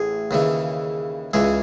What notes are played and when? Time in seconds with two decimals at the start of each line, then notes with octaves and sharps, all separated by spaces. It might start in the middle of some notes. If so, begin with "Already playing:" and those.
Already playing: A1 A2 G#4
0.31 D#2 C#3 E3
1.34 C#2 C#3 E3 G#4